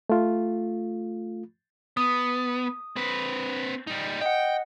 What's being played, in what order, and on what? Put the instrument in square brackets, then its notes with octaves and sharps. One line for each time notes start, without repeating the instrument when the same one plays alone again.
[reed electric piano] A3 F4
[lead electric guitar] B3 [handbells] D#6
[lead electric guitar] C4 B4
G3 D#4
[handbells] D#5 F#5 [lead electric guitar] G5